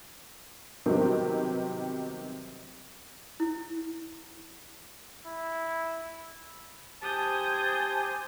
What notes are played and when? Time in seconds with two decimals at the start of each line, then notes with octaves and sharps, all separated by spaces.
0.86 C3 D#3 F#3 G3 B3 C4
3.40 E4
5.26 E4
7.02 G4 C5 G#5 A5 D#6 G6